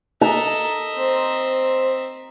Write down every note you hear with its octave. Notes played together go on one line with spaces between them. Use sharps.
A4 D#5 E5 A#5
C4 C5